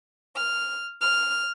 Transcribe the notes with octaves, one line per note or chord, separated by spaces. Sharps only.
F6
F6